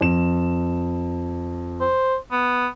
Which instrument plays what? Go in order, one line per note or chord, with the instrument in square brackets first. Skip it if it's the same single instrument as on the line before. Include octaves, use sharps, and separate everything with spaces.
[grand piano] F2 E7
[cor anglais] C5
B3